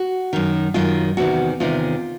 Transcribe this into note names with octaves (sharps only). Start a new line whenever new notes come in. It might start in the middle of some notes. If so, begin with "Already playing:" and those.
Already playing: F#4
F#2 D#3
F#2 D#3 F4
E2 C3 D#3 F#4
E2 C3 D#3 F4